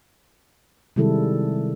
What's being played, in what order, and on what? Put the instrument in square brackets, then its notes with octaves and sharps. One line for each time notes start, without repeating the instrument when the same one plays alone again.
[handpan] C3 D#3 G3 G#3 E4 A4